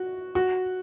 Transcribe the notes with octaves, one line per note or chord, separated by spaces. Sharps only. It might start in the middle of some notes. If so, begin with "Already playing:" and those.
Already playing: F#4
F#4